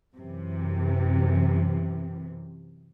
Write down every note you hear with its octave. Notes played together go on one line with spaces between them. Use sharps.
F#2 C3 E3